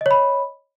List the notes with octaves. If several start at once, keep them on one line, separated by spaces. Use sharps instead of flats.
C#5 D#5 B5